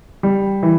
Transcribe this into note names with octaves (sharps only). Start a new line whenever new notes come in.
G3
E3